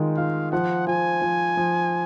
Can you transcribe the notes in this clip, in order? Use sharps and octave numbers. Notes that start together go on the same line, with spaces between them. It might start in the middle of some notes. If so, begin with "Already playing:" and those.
Already playing: D#3 G#3 F4
F4 F5
F3 F#5
F3 G#5
F3
F3